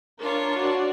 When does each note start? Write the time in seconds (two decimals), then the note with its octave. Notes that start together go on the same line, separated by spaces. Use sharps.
0.19 D4 F4 A#4 C#5
0.58 F#4 D5